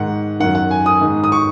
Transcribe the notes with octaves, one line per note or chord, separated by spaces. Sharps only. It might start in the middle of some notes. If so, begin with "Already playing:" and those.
Already playing: G#2 D#3 F#5
F#2 D#3 F#5
F#5
G#5
D#6
G#2 D#3
D#6
C#6